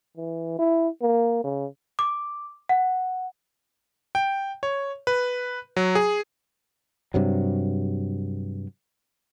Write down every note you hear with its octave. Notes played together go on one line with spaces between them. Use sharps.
E3
E4
A#3
C#3
D6
F#5
G5
C#5
B4
F#3
G#4
G2 C3 F#3